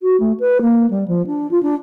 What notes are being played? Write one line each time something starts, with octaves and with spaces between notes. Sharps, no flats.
F#4
A3
B4
A#3
G3
F3
D4
F4
D4